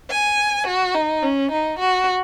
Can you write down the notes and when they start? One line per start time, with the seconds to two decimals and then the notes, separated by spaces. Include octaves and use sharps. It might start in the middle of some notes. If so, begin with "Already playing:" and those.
0.10 G#5
0.67 F#4
0.94 D#4
1.23 C#4
1.51 D#4
1.79 F#4